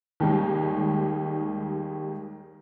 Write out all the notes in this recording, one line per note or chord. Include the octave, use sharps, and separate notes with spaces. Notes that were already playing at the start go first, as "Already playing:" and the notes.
D#2 D#3 G3 G#3